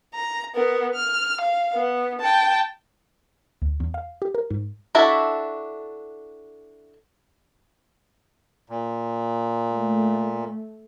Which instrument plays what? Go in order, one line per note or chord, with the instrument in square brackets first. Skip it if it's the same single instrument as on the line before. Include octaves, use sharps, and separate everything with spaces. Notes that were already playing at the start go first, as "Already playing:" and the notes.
[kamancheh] A#5
B3 A#4
F6
F5
B3
G5 A5
[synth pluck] D2
E2
F5
G4
A#4
G#2
[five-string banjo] D4 E4 F#4 A4 E5
[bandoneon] A#2
[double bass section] A3